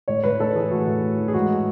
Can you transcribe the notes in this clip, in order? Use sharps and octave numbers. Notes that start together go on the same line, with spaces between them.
A2 C#5
A2 B4
A3 A4
E3 G#4
A2 F#4
A2
A3
E3
G#4
G#2 F#4